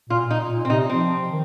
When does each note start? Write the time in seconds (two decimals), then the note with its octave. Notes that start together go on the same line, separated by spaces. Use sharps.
0.10 A#2 F4
0.30 D#4
0.50 A#2
0.65 C4
0.70 C3 D#4
0.90 F3 C4
1.29 D#3